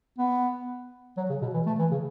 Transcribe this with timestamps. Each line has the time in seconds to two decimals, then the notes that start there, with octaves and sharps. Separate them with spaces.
0.18 B3
1.17 F#3
1.30 C#3
1.42 B2
1.54 E3
1.66 A3
1.79 E3
1.91 C#3